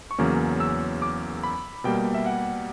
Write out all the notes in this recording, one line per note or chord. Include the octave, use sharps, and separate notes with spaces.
C#6
E2 C#3 F#3 A#3 C#4 D6
E6
D6
B5
B2 G3 A#3 G5
E5
F#5